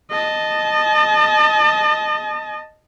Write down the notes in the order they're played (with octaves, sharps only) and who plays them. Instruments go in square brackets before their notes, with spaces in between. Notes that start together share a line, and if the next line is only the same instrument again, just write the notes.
[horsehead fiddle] D#5 A5